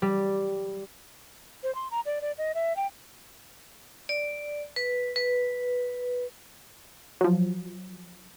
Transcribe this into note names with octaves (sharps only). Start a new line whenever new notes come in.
G3
C5
C6
A#5
D5
D5
D#5
E5
G5
D5
B4
B4
F3 F#3